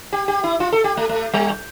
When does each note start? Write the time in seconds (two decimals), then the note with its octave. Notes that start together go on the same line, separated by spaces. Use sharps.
0.12 G4
0.28 G4
0.44 E4
0.60 F4
0.72 A4
0.84 G4
0.97 A3
1.09 A3
1.34 G3